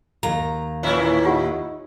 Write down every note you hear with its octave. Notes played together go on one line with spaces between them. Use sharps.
D#2 A#5
A2 E3 C#4 E4
D#4 F4 G4 F#5